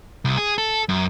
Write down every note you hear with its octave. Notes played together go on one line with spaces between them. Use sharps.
C2
G#4
A4
F#2